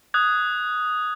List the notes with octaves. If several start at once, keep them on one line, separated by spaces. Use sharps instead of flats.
D#6 F#6 G#6